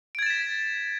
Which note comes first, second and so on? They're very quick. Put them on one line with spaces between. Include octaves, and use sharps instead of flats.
D7 G#6 A6 E7 B6